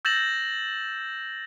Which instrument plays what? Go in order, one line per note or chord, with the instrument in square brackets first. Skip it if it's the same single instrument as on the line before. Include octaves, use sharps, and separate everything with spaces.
[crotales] E6 G6 A6 A#6 E7 F#7